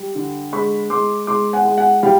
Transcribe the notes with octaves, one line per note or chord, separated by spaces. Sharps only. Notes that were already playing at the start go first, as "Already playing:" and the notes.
Already playing: G3
D3
G#3 B5 C#6
G#3 C6 D6
G#3 C6 D6
F#5 G#5
G#3
F#5 G#5
G3 F5 G5